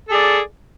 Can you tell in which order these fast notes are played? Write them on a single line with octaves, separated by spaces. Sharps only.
A4 G#4 D5